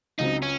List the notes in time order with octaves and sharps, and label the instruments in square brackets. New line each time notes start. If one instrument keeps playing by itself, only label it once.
[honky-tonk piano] C#2 C#3 F#3 C4 [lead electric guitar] D#4
[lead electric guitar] C#4